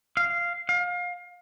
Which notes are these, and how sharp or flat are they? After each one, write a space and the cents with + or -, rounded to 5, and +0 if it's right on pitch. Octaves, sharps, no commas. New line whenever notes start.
F5 -10
F5 +30